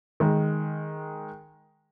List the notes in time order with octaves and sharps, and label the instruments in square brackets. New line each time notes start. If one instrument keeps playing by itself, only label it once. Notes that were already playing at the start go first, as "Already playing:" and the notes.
[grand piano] D#3 G#3